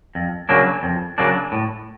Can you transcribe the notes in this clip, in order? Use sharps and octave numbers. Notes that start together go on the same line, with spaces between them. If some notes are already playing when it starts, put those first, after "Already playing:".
F2
C#3 F#3 A#3 D4
F2
C#3 F#3 A#3 D4
A2